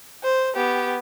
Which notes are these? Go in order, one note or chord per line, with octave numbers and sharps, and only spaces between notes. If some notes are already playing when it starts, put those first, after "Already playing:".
C5
B3 G4